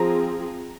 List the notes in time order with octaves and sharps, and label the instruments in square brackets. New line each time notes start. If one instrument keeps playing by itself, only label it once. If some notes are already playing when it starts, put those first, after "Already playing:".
Already playing: [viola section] F3 C4 F4 G#4 [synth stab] A#5